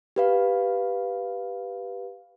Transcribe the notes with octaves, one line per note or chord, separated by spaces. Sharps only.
G4 B4 F5